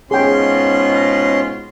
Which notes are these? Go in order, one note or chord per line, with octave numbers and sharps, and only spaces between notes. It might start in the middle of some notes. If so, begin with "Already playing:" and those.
G#2 B2 C#4 F4 G#4 G5 C6